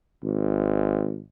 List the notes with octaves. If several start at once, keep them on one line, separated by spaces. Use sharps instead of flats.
G#1